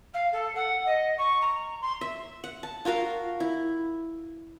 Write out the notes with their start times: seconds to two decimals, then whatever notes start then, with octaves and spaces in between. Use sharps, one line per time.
0.13 F5
0.32 A4
0.55 F#5
0.86 D#5
1.17 C#6
1.41 A#5
1.81 C6
2.01 E5
2.44 F#5
2.63 A5
2.85 F4 F#4 A#4 F5
3.40 E4